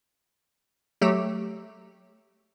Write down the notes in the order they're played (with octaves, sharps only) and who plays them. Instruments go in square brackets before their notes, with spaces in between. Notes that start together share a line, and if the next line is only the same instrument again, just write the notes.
[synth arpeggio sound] F#3 A3 G4